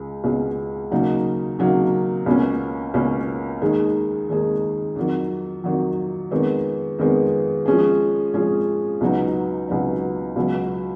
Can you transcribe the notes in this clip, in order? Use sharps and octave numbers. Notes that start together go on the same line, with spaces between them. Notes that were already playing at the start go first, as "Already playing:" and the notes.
Already playing: C#2 G#3
C#2 B2 G#3
D#2 C#3 F#3 A#3 D#4
D#2 C#3 F#3 A#3 D#4
C#2 B2 A#3 C#4
C#2 B2 A#3 C#4
D#2 D#3 G#3 D#4 G#4
D#2 D#3 G#3 D#4 G#4
F2 D#3 F#3
F2 D#3 F#3
F2 D#3 G#3 B3
F2 D#3 G#3 B3
F3 G#3 C#4 G#4
F3 G#3 C#4 G#4
C#2 B2 F#3 B3 D#4
C#2 B2 F#3 B3 D#4
C#2 B2 F#3